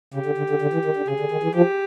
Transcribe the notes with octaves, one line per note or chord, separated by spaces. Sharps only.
C#3 G4
D3
D3
D3
D3
E3
D#3
D3
C#3 G#4
D3
D#3
E3
F3 G4